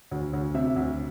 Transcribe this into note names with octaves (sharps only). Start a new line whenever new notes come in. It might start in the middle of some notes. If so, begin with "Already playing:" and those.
D2
D2
C3 E5
D2